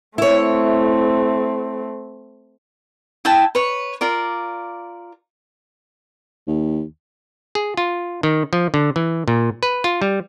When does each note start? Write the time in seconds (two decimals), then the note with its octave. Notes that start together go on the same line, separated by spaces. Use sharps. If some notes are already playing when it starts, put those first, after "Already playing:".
0.18 A3 C4 E4 C#5
3.25 E4 G5 A5
3.55 B4 C#5
4.01 F4 A#4 D5
6.47 D#2
7.55 G#4
7.77 F4
8.23 D#3
8.53 F3
8.74 D3
8.96 E3
9.28 A#2
9.63 B4
9.84 F4
10.02 G3